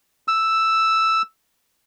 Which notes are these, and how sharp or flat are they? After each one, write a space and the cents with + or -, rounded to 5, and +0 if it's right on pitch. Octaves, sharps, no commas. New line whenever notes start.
E6 +0